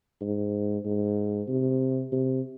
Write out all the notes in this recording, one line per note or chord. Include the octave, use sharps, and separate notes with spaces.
G#2
G#2
C3
C3